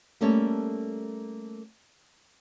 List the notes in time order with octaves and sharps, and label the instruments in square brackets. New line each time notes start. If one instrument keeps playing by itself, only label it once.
[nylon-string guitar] G3 A3 A#3 C#4 A4 C#5